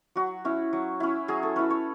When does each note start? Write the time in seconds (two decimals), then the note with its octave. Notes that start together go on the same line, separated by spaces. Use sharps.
0.16 F#3 F#4
0.45 C#4 E4
0.73 F#3
1.00 C#4 E4
1.28 F#3 G#4
1.43 A4
1.56 C#4 E4 B4
1.70 C#5